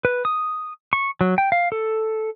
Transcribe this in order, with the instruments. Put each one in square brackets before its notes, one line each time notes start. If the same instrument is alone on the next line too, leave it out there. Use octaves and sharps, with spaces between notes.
[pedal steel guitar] B4
D#6
C#6
F#3
G5
F5
A4